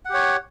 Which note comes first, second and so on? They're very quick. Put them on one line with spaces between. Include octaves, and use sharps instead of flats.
F#5 G4 C#5